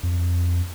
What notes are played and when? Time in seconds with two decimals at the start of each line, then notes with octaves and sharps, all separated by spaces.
0.03 F2